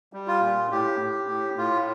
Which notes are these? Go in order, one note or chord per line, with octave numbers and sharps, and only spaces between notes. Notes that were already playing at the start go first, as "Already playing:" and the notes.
G3
F4
A#2
A2 G4
A2
A2
A2 F4